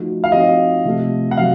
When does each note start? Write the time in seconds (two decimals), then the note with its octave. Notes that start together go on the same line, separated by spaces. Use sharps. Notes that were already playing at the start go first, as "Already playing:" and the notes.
Already playing: F3 A3 D#4 F#4
0.24 F5
0.32 F3 C4 D#4 F#4 D#5
0.85 C3 F3 A3
1.31 F#5
1.37 C3 F#3 F5